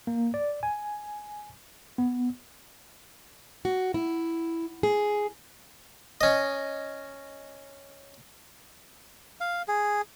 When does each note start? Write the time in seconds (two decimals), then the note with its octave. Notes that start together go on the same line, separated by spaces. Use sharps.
0.07 A#3
0.34 D5
0.63 G#5
1.98 B3
3.65 F#4
3.94 E4
4.83 G#4
6.21 C#4 D#5
9.40 F5
9.68 G#4